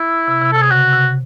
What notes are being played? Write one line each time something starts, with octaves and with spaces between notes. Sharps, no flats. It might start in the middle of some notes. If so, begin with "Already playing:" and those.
Already playing: E4
C3
C3
C3 A4
G#4
C#3 F#4
C3